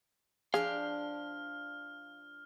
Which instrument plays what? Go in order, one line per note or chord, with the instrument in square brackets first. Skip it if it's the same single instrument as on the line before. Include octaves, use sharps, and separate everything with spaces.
[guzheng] F3 D4 G5 [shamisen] G#4 [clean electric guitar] F5 [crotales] F6